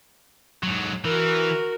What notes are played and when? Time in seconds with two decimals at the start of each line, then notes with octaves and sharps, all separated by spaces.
0.63 G#2 F#3
1.05 E3 F#4 A#4